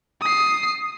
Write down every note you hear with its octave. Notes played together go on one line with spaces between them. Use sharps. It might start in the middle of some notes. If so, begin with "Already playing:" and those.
D#6 C7